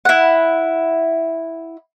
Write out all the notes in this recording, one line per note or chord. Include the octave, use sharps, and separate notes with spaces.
E4 F#5